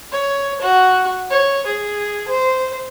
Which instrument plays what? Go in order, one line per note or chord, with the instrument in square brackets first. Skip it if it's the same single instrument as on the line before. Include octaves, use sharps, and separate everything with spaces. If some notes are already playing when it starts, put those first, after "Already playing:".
[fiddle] C#5
F#4
C#5
G#4
C5